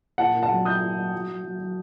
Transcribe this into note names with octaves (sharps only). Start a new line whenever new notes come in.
A#2 F#5 A5
A#2
F#5 A5
F#3
A#2 D#6 G6
A#2
F#3
F#3
F#3
F#3
F#3